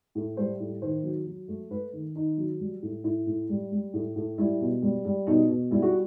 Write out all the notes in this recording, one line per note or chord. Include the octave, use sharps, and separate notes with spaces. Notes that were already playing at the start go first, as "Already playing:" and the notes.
A2
G3 C5
A2
D#3 C5
F#3
F#3
A3
A3 B4
D#3
D#3 D#4
F#3
G3
A2
A2 E4
A2
G3
G3
A2
A2
G3 E4
B2
G3
G3
B2 D#4
B2
G3 E4
F#4